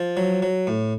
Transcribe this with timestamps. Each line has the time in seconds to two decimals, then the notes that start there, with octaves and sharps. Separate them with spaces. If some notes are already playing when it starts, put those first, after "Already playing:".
Already playing: F3
0.17 F#3
0.42 F#3
0.67 A2